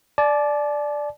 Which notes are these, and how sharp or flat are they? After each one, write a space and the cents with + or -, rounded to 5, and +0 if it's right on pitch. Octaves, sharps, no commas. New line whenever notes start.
D5 +0 A5 -40